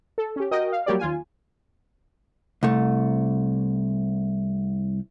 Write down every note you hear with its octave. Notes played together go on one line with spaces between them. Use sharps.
A4
C#4 G4
F#4 A#4 D#5 G5
F5
F#3 G3 A#3 G4 C#5 D5
D#2 F4 G#5
C2 A3